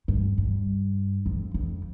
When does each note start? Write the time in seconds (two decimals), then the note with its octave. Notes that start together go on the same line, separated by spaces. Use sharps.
0.08 G2
0.38 G2
1.26 F2
1.54 F2